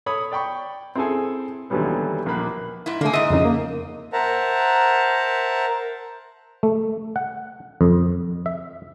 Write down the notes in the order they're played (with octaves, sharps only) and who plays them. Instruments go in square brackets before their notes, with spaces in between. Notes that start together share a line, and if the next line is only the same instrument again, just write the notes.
[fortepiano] A4 C#5 B5 D#6
D5 G5 B5 C#6
C4 E4 G#4 A4 G#5
D#2 D3 E3 F#3 G3 B3
A#1 A#3 B5 F#6
[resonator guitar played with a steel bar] G#2 E4
[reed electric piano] D3 A3 [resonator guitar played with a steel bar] A#3 G#4
[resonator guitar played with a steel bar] G#2 D#5 [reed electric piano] E5
[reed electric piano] F2 C#3 D#4
A#3
[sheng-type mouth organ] A#4 C5 E5 F#5 A5 A#5
[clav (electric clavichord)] A3
F#5
F2
E5